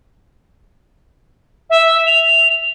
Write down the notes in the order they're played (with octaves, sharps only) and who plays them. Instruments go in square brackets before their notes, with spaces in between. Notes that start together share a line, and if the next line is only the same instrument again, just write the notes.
[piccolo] E5
F7